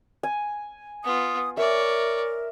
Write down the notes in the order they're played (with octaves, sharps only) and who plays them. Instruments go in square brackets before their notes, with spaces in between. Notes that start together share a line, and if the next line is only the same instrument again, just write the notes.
[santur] G#5
[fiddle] B3 F4 [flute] D#6
[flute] A#4 [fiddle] C#5 D5 [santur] E5